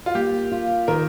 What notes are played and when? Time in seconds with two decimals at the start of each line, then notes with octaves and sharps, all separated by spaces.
0.06 F4
0.15 A#3 G4
0.52 F4
0.88 D#3 A#4